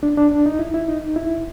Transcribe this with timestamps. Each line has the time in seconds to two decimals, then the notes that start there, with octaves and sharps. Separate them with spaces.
0.03 D4
0.17 D4
0.31 D4
0.46 D#4
0.59 E4
0.74 E4
0.88 D#4
1.16 E4